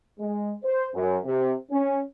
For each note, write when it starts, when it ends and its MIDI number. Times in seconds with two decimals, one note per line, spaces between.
0.19 0.53 56
0.64 0.87 72
0.94 1.17 42
1.25 1.54 48
1.71 2.00 61